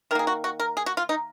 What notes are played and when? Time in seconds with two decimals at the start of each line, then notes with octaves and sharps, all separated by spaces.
0.11 D#3 A#4
0.15 A#3 G#4
0.27 F#4
0.44 F#4
0.59 A#4
0.77 G#4
0.86 F#4
0.97 F4
1.09 D#4